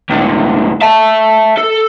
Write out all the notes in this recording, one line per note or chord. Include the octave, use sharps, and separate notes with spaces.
C#2 A2
E5 A5
A4